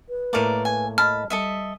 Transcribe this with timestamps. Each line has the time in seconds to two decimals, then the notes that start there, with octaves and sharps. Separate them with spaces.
0.09 B4
0.33 A2 A3 A#3 A#4 D5
0.65 G#5
0.98 D#5 A5 B5 F6
1.30 G3 A4 D#5 E5